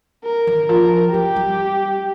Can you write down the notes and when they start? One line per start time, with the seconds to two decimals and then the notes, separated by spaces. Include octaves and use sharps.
0.24 A#4
0.47 D#3
0.69 F3 A#4
1.13 F3 G4
1.36 G3